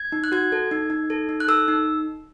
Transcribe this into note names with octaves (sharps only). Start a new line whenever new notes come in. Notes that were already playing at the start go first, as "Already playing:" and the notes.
Already playing: G#6
D#4
F#6
F#4 G#6
A4
D#4
D#4
A4
D#4
F#6
A4 E6
D#4